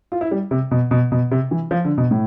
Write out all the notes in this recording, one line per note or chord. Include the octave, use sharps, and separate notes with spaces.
F4
E4
G3
C3
B2
B2
B2
C3
E3
F3
D3
B2
A2